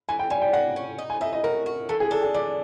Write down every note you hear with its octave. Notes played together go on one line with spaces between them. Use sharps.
E3 G#5
G5
G3 G#5
G5
A#3 F#5
C#4
D#4
G#5
D#4 E5
D#5
F#4 A#4
F#4
E3 A4
G#4
D4 A4
G#4
E3 D5